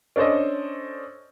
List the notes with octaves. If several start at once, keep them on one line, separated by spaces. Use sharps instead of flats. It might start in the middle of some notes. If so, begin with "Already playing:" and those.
C#4 D4 A4 C5 D#5